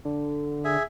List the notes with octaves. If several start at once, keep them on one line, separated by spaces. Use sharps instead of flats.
D3
G#4 E5